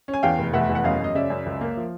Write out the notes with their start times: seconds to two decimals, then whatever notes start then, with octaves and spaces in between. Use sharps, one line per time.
0.08 C#4
0.14 G#5
0.23 E2 F5 G5
0.39 F1
0.53 F1 E5 F#5
0.69 E2
0.75 F#5
0.84 F#2 D#5 F5
1.00 F#2 D#5
1.15 C#3 D5 E5
1.30 F#2
1.46 C#2
1.61 A#3
1.77 F3